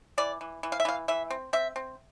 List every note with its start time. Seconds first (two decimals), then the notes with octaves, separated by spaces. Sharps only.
0.18 E3 D5
0.41 E3
0.63 E3
0.72 F5
0.80 E5
0.85 E3 F5
1.08 E3 E5
1.30 C4
1.53 C4 E5
1.76 C4